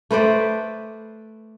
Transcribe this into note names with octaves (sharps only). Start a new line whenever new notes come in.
A3 B4 C5 D5